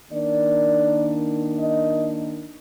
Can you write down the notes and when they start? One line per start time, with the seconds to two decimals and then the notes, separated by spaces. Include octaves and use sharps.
0.11 D#3 A#3 D4 D5
1.58 D#5